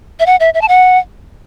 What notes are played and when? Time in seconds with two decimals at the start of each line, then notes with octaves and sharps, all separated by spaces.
0.20 E5
0.26 F#5
0.40 E5
0.54 E5
0.61 A5
0.68 F#5